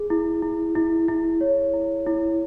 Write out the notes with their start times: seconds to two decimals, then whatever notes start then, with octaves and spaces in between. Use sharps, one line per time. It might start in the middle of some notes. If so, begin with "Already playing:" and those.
Already playing: G#4
0.10 E4
0.42 E4
0.76 E4
1.08 E4
1.41 C#5
1.73 E4
2.06 E4